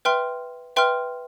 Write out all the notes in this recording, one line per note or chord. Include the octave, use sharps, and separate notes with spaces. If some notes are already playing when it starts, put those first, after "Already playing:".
B4 E5 G5 C6 F6
B4 E5 G5 C6 F6